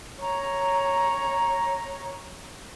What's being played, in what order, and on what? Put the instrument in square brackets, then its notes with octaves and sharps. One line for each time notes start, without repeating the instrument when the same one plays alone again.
[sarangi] C#5 [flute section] A#5